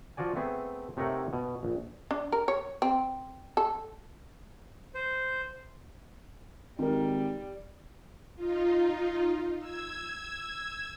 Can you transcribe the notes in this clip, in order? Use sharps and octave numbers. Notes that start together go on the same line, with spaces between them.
F3 F4 F#4 D5 G#5
A3 B3 C4 G#4
C3 A3 D#4 A#4 C#5 F#5
B2
A#1
D4
A#4
C#5
C4
A4
C5
G#1 G3 D#4 A#4
D#4 F4
E6 G#6